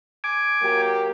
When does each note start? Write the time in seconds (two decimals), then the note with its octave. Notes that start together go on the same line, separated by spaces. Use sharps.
0.24 G#5 D6
0.62 F#3 A#3 G4